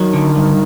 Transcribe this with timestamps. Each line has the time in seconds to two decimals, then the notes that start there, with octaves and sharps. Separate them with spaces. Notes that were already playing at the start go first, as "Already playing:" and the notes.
Already playing: D#3 F#3
0.14 D3
0.36 G2